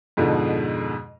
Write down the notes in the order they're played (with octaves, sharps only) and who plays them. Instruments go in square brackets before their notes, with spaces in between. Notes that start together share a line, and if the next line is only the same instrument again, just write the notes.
[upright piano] F2 G#2 B2 D3 F3